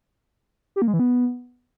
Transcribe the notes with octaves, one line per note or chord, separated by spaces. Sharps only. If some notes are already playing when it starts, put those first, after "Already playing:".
G4
A#3
G#3
E3
B3